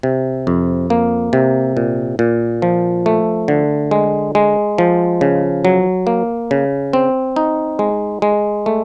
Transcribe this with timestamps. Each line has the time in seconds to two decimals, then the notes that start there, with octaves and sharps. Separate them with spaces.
0.03 C3
0.47 F2
0.90 A#3
1.33 C3
1.77 A#2
2.19 A#2
2.62 F3
3.06 A3
3.48 D3
3.91 G#3
4.35 G#3
4.78 F3
5.21 C#3
5.65 F#3
6.07 A#3
6.51 C#3
6.93 C4
7.36 D#4
7.79 G#3
8.22 G#3
8.66 A3